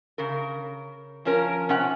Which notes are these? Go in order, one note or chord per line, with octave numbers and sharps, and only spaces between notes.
C#3 A#4
F3 C#4 A#4
C3 C#4 F#5